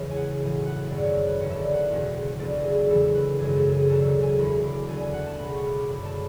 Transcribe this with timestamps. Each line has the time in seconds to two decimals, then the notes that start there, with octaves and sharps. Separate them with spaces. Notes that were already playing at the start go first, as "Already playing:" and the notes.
Already playing: E2 C#3 E3 G#3 C#4 C#5 E5
0.10 G#5
0.16 F#5
0.40 B1 A2 E3 G#5
0.66 F#5
0.90 G#1 F#2 D3 A3 C#4 D5
1.02 C#5
1.28 B4
1.40 E1 E2 D3 C#5
1.50 E5
1.56 D5
1.73 F#5
1.89 F#1 E2 B2 A3 C#4
2.39 B1 B2 A3 D4 D5
2.64 G#4
2.89 E2 C#3 E3 G#3 A4
3.15 B4
3.38 G#1 F#2 C#3 G#3 G#4
3.56 A4
3.72 G#4
3.89 E1 D2 C#3 F#3 A4
4.06 A4
4.22 G#5
4.38 E2 D3 A3 B5
4.64 D6
4.88 D2 D3 A3 D4 G#5
5.01 G#5
5.13 F#5
5.26 A5
5.38 C#2 B2 A3 B5
5.55 C#6
5.71 D6
5.87 F#1 F#2 D3 B5
6.05 A5